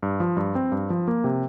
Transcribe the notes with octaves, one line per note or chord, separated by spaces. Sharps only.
G2
F3
G2
C4
G2
F3
A#3
C3